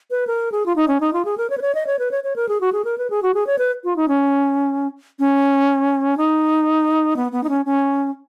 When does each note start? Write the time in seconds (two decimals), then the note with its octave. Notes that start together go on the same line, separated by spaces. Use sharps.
0.11 B4
0.27 A#4
0.52 G#4
0.66 F4
0.76 D#4
0.88 C#4
1.00 D#4
1.13 F4
1.25 G#4
1.38 A#4
1.50 C#5
1.58 B4
1.62 C#5
1.75 D#5
1.87 C#5
1.99 B4
2.11 C#5
2.24 C#5
2.36 A#4
2.49 G#4
2.61 F#4
2.73 G#4
2.85 A#4
2.98 B4
3.10 G#4
3.23 F#4
3.34 G#4
3.47 C#5
3.59 B4
3.84 F4
3.96 D#4
4.08 C#4
5.19 C#4
6.17 D#4
7.16 B3
7.32 B3
7.44 D#4
7.49 C#4
7.65 C#4